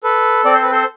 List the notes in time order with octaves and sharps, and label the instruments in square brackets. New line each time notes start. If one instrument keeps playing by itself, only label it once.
[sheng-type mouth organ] A4 B4
C4 D5
C5
B4
A4 C5